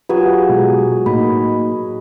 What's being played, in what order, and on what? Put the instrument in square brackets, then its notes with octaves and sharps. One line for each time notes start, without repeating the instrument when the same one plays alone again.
[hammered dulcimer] F#3 G#4 [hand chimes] F4 G4 [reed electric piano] B4
[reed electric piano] B2 G#3
[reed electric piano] A2 A#3 D#4 [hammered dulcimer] D#5 [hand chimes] B5